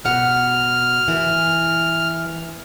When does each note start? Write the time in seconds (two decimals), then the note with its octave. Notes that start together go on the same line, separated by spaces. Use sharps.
0.05 B2 F#5 F6
1.08 E3